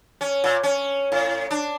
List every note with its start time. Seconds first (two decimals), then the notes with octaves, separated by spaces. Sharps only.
0.21 C#4
0.44 A#2
0.63 C#4
1.12 A2
1.51 D4